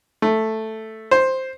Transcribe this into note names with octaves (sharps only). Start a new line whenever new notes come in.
A3
C5